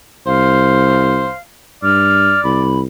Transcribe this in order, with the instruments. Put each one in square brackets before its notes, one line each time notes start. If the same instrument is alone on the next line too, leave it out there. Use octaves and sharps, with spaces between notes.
[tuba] C2 [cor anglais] C5 [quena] F5
[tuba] G2 [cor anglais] D5 [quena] F6
[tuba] C2 [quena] B5